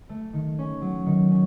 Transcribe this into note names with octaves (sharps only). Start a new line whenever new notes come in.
A3
D#3
C#4
F#3
D#3
C#4